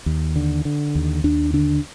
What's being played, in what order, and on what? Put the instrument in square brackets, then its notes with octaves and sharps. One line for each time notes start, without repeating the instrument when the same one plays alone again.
[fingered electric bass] D#2
D3
D3
D#2
D#2 D4
D3 D4